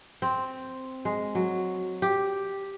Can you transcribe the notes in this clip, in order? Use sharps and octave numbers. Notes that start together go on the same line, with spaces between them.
C4
G#3
F#3
G4